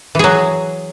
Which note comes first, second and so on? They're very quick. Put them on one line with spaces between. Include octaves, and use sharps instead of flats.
E3 G#4 F#3